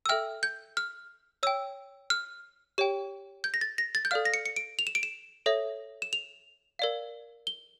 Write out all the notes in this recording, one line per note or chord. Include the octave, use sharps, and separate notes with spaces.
E6
A4 E5 G5 F6
G6
F6
C#5 G5 E6
F6
G4 C#5 G5
G6
A#6
A6
A#6
A6
G6
A4 D5 F5 F6
A#6
C#7
C#7
D7
F7
E7
D7
E7
A4 C#5 E5
E7
F7
A#4 D5 F5
G7